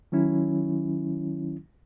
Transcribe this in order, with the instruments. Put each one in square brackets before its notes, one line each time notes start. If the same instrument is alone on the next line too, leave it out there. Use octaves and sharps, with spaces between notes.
[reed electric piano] D#3 F#3 C#4 E4